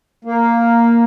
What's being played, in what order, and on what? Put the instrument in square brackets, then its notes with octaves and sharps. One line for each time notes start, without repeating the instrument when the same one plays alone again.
[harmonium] A#3